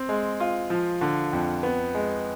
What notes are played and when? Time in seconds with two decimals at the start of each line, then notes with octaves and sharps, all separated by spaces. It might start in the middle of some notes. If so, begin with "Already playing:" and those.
Already playing: C4
0.09 G#3
0.40 F4
0.70 F3
1.01 D3
1.33 F2
1.63 B3
1.95 G#3